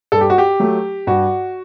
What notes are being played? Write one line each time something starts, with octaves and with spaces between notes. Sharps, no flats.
G2 A4
G4
F#4
G4
F#3 A3
G2 F#4